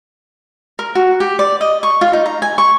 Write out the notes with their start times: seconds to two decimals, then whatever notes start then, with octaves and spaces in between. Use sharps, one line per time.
0.79 A#4
0.95 F#4
1.20 G4
1.39 D5
1.61 D#5
1.83 C#6
2.01 F4
2.13 D#4
2.26 A#5
2.42 G#5
2.58 C#6